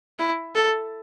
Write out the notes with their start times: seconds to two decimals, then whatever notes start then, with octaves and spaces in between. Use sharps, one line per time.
0.19 E4
0.56 A4